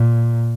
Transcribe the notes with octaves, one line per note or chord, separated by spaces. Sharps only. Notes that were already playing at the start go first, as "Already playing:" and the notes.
Already playing: A#2